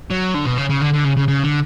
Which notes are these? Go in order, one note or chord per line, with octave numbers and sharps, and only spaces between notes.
F#3
D3
B2
C#3
C#3
D3
D3
C#3
C#3
C#3
D3